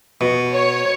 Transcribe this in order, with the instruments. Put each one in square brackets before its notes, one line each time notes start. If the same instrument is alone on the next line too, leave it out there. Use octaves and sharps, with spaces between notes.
[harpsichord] B2
[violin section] C#5